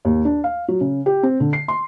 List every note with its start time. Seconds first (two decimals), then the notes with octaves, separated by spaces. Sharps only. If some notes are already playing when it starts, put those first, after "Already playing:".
0.05 D#2
0.25 D4
0.44 F5
0.68 F#3
0.81 C#3
1.06 G4
1.23 C4
1.40 D3
1.53 C7
1.68 C6